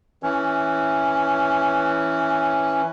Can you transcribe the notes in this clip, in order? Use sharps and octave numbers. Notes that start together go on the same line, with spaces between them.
E3 C#4